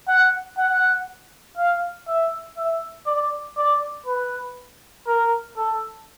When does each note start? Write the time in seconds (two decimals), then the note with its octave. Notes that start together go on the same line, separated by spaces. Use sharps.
0.08 F#5
0.58 F#5
1.57 F5
2.08 E5
2.57 E5
3.06 D5
3.57 D5
4.06 B4
5.07 A#4
5.56 A4